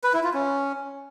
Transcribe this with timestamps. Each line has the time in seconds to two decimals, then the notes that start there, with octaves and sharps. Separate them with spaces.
0.04 B4
0.14 E4
0.24 F4
0.34 C#4